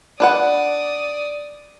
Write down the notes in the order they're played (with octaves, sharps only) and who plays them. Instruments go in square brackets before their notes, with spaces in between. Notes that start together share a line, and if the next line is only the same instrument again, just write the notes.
[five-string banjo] D4 B4 F#5 [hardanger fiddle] D5 D#6